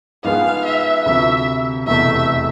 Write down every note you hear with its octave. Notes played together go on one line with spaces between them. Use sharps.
G#2 F3 B3 F4 G#4 F5
E5
D2 C3 F3 E5
F1 E2 B2 A3 E5